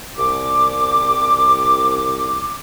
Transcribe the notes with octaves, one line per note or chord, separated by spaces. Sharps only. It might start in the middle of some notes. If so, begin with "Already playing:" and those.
C2 D6